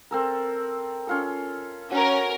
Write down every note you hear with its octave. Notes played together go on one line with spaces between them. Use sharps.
C4 A4 A#4
C#4 F4 A4
C#4 F#4 A#4